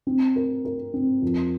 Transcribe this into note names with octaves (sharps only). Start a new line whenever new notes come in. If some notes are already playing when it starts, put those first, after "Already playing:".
C4
A#4
A#4
C4
F2